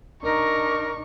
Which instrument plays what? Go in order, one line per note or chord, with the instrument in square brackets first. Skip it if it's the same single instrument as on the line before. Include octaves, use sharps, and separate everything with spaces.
[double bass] D4 D#4 [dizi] A#4 [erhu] C#6